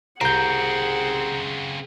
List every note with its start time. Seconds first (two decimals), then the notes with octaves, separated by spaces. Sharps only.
0.21 C2 C#3 C4 G#4 F#5 A#5 G6